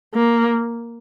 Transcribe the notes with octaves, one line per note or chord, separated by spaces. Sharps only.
A#3